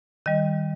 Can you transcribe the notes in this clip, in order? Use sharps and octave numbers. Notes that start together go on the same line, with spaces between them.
D#3 G3 D#5